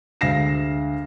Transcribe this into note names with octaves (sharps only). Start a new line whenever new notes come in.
D2 G#3 F5 A#6 C7 E7